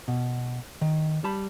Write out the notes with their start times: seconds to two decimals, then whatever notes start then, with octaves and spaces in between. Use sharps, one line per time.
0.08 B2
0.81 D#3
1.24 G3 A5 B5